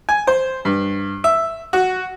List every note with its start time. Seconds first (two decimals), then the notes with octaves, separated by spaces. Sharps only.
0.09 G#5
0.27 C5
0.65 G2
1.24 E5
1.73 F#4